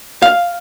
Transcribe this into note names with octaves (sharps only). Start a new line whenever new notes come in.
F5